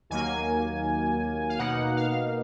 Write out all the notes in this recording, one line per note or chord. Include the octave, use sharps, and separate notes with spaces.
D#2 D#3 F#3 A#3 G#5
F5
B2 A#3 D#4 F#5
F5